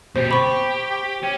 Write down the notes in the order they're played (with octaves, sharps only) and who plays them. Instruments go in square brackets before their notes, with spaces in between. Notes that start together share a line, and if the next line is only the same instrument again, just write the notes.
[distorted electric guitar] B2 G4 [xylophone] C5
[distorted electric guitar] G4 [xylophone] B5 C#6
[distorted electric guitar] C#4